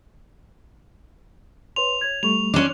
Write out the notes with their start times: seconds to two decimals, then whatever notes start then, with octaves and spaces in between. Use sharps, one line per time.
1.76 B4 C#5 C6 F7
2.01 C#5 G#6
2.23 G3 A3 B5 C#6 F7
2.54 C#4 D4 C6 D6